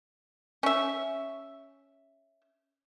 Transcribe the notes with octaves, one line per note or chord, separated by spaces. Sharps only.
C#4 E5